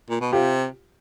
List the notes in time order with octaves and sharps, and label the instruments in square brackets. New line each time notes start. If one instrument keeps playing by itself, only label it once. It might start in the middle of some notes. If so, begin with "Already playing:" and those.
[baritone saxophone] A#2
B2
[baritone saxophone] C3 [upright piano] F4 G4